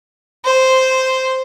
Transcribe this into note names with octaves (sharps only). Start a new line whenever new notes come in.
C5